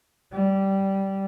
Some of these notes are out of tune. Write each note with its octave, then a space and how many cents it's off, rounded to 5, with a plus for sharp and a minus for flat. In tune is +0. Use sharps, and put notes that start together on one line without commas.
G3 -15